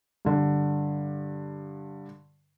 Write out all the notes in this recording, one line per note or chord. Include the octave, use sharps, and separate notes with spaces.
G2 D3